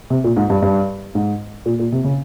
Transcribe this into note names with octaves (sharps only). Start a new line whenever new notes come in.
C3
A#2
G#2
G2
G2
G#2
A#2
A#2
C3
C#3